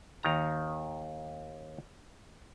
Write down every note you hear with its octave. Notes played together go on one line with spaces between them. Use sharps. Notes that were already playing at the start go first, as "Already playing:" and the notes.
D#2 D#3 A#5